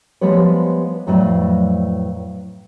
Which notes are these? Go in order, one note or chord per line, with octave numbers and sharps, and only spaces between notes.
F3 G3 G#3 B3 B4 C#5
F2 A2 F#3 B4 D5 F5